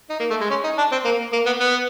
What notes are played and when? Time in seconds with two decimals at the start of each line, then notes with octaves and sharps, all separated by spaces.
0.10 D#4
0.20 A#3
0.30 A3
0.41 G#3
0.50 C#4
0.64 D#4
0.78 D4
0.92 C4
1.05 A#3
1.33 A#3
1.46 B3
1.60 B3